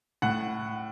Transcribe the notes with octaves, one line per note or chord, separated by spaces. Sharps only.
A2 F#5